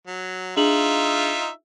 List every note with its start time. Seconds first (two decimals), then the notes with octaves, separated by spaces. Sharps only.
0.07 F#3
0.57 D4 D#4 F4 G#4 E5 F#7